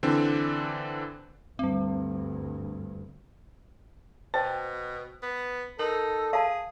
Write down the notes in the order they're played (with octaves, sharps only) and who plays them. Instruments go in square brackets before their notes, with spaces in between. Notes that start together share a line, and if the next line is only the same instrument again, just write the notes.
[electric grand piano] D3 E3 C4 D4
[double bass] D2 G2 [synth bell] G3 C4
[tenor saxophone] B2 [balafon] C5 [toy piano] G5 A5
[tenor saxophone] B3
[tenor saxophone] D#4 [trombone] A4 [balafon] A#4
[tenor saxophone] G#4 [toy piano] F5 A5